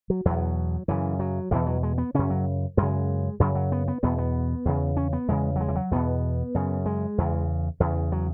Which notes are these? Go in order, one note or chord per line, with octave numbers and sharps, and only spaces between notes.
F#3
E2 B2 F#3
F#2 C#3 E3
F#3
E2 B2 E3
F#3
G#3
B3
F#2 C#3 C#4
F#3
F#2 C#3 G#3
F#2 C#3 F#3
F#3
B3
B3
E2 B2 B3
B3
E2 C#3
C#4
B3
E2 C#3 G#3
F#3
G#3
E3
F#3
E2 B2 B3
F#2 C#3
G#3
E2 C#3
E2 C#3
F#3